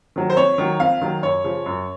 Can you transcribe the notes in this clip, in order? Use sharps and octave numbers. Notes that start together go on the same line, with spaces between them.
D#3 F#3
C5
F2 C#5
D#3 F#3
F2 F5
D#3 F#3
F#2 C#5
C#3 F3
F#2